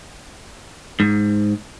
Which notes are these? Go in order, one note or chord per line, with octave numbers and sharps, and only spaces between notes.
G#2